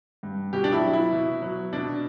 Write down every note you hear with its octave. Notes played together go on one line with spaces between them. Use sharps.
G2
B2 G4
D4
E4
F#3
E4
B2
F#3
B2 D4